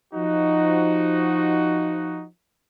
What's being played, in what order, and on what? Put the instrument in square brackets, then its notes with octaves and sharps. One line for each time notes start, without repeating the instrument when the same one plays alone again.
[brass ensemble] F3 D#4 F#4